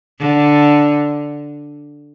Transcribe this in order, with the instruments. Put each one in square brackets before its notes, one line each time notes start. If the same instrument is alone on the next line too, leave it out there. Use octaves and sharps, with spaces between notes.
[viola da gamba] D3